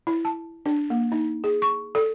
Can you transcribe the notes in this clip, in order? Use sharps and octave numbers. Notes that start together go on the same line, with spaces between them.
E4
A5
D4
A#3
D#4
G#4
C#6
A4